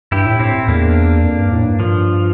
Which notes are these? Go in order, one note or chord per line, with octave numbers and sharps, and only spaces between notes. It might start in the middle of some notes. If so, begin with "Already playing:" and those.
G2 E4 G4
A2
A2 C4 E4
E2 A#3 D4
F2
G2
A2
G2
F3